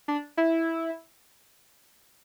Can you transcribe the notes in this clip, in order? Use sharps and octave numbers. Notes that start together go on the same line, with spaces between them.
D4
E4